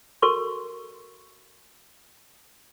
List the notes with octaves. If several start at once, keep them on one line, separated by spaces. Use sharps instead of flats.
F#4 A4 A#4 C6 C#6